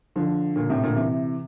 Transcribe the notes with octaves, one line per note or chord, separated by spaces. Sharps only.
D3 F3
A#2 D3
A2 C3
A#2 D3
C3 E3